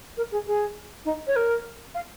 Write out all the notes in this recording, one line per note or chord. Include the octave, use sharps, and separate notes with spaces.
A#4
G#4
G#4
D#4
C#5
A#4
F5